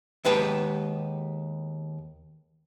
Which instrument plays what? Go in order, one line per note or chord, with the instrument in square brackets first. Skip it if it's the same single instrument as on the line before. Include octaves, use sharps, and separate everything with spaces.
[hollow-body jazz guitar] D#2 G#3 B3 G4 B4 A5